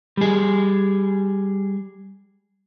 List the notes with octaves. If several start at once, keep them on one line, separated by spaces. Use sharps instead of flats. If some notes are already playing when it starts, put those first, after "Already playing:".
G3 G#4